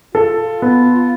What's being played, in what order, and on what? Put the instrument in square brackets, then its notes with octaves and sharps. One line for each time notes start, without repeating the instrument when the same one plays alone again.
[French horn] F4 [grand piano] A4
[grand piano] B3